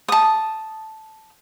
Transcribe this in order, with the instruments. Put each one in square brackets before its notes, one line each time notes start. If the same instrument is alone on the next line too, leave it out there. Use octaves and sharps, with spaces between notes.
[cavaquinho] A5 D#6